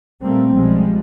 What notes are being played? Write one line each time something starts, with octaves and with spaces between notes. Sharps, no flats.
A#2 G3 A3 A#3 C4
B1 F3 G3 G#3